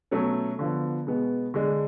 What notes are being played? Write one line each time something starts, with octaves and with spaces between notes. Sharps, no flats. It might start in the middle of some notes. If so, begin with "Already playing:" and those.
B2 F#3 A3 C#4
D3 F3 B3
B2 G#3 B3
D3 G#3 D4